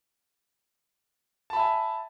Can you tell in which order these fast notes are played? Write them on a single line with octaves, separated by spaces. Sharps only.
A5 B5 E5 G#5